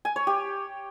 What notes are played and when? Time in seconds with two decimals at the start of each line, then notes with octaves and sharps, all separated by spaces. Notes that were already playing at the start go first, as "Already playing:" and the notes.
0.05 G#5
0.16 C#5
0.27 G4